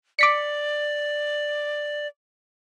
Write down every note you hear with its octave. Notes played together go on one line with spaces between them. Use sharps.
D5 D6 B6 C#7